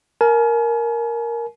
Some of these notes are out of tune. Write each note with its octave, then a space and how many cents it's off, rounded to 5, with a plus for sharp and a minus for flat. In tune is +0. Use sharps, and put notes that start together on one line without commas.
A#4 +0 G#5 +40